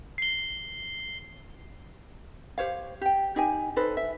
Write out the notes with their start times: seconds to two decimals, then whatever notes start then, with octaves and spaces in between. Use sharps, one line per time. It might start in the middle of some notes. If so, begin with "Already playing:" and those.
0.18 C7 G7
2.58 G4 C5 C#5 F5
3.01 G4 G5
3.36 D#4 G4 G5 G#5
3.76 D#4 A4 B4 C5
3.97 E5